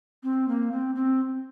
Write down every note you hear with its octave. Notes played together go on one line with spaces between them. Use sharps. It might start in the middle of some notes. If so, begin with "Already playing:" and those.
C4
A#3
C4
C4